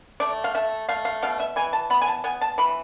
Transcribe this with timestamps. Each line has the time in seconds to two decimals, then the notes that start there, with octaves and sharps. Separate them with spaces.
0.20 A3 D5
0.44 F5
0.55 A3 E5
0.89 A3 F5
1.05 F5
1.23 B2 F5
1.40 E5
1.56 E3 G#5
1.73 A5
1.90 B3 B5
2.02 G#5
2.08 A5
2.24 B3 G#5
2.41 A5
2.58 E3 B5